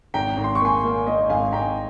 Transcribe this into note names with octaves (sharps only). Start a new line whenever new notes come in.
G#1 G5 A#5
G#1
C6
C#6
A#3 G#5 C6
A#3
A#3 D#5
G#1 F5 G#5
G#1 G5 A#5